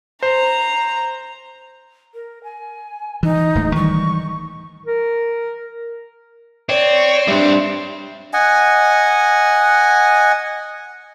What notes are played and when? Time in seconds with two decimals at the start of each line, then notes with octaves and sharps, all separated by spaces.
0.23 C5 A#5
2.14 A#4
2.44 G#5
3.23 E3 D#4
3.55 D1 A2 G#3
3.76 D#3 E3 G3 C#6
4.86 A#4
6.69 C4 C#5 D5
7.28 G3 D4 E5 C6
8.34 D#5 F#5 G#5